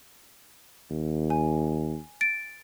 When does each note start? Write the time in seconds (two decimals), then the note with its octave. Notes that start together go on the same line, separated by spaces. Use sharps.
0.91 D#2
1.30 G#5
2.21 A6 D7